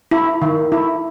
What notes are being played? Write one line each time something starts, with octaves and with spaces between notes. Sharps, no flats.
E4
D#3
E4